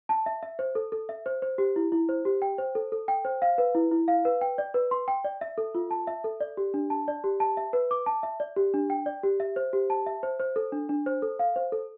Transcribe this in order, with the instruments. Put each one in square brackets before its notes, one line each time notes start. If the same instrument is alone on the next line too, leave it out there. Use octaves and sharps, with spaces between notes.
[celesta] A5
E5
E5
C5
A4
A4
E5
C5
C5
G4
E4
E4
C5
G4
G5
C5
A4
A4
G5
C5
F5
B4
E4
E4
F5
B4
G5
D5
B4
C6
G5
D5
E5
A4
F4
A5
E5
A4
D5
G4
D4
A5
D5
G4
A5
E5
B4
D6
A5
E5
D5
G4
D4
G5
D5
G4
E5
C5
G4
A5
E5
C5
C5
A4
D4
D4
C5
A4
F5
C5
A4